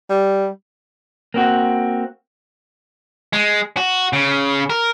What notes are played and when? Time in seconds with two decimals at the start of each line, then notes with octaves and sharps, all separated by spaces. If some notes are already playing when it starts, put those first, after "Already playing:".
0.09 G3
1.34 A#3 C4 F#4
3.33 G#3
3.77 F#4
4.13 C#3
4.70 A#4